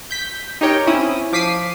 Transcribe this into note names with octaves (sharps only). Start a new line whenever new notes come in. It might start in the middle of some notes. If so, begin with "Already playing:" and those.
G6 B6
D#4 G4 A#4 C#5 G5
C4 C#4 E4 D#6
F3 D6 B6 C7 D#7